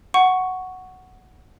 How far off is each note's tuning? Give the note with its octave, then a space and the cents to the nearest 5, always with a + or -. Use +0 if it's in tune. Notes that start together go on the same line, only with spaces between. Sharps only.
F#5 +0 C#6 +0